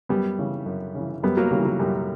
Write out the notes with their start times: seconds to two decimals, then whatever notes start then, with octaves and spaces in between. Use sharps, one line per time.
0.09 F#2 G3 B3
0.39 C#3 E3
0.66 F#2
0.95 C#3 E3
1.23 F#2 G3 B3
1.37 F#3 A#3
1.51 C#3 E3 G3
1.65 F#3
1.80 F#2 G3